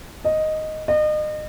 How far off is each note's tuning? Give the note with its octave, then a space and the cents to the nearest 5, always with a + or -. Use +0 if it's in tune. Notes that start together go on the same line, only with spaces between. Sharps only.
D#5 +0
D#5 -35